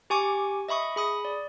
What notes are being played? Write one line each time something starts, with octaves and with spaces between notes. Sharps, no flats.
G4 G#5 C#6 D6
D#5 E5 B5 C#6 D#6
G#4 B5 D#6
D5